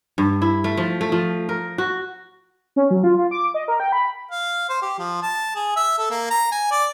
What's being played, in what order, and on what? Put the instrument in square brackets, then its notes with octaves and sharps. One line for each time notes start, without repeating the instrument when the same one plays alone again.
[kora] G2
E4
A3
F3
A3
F3
A#4
F#4
[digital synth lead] C#4
F#3
F4
F4
D6
D#5
A#4
G5
B5
[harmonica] F5
C5
G4
F3
A5
G#4
E5
A4
A#3
A#5
G#5
D5